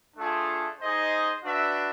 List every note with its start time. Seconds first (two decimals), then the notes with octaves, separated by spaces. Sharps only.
0.16 A3 D4 F4 G#4
0.80 D#4 G#4 C5 D#5
1.44 D4 F#4 B4 E5